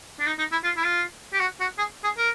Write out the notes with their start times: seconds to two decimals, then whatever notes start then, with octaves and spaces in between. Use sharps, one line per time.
0.20 D4
0.26 D#4
0.39 D#4
0.52 E4
0.64 F4
0.77 E4
0.84 F4
1.33 G4
1.40 F#4
1.60 F#4
1.78 G#4
2.04 G#4
2.17 A#4